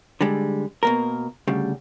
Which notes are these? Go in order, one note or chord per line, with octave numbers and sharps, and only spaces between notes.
D3 G3 G#3
B2 A#3 A#4
D2 C#3 G3